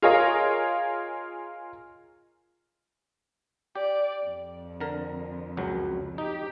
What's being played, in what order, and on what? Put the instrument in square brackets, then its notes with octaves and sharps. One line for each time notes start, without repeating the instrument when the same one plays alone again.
[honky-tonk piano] F4 G#4 A#4 C#5 D#5 F5
[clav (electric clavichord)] G4 [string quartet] D5
[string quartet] F2
[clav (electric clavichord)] D3 A#4
C#2 F#2 F#3
[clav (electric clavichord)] D#4 [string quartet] G4